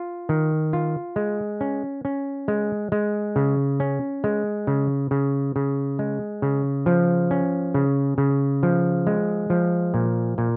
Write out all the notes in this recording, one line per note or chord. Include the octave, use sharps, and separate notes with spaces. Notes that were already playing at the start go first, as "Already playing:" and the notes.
Already playing: F4
D#3
F4
G#3
C#4
C#4
G#3
G#3
C#3
C#4
G#3
C#3
C#3
C#3
G#3
C#3
F3
C#4
C#3
C#3
F3
G#3
F3
A#2
A#2